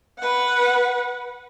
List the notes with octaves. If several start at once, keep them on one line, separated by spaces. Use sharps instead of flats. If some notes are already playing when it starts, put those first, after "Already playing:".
B4 F#5